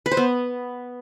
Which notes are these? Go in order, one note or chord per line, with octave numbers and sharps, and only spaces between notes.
B4
C5
B3